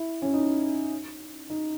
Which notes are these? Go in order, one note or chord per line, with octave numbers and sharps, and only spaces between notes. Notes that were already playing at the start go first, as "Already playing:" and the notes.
Already playing: E4
C#4
D#4
D#4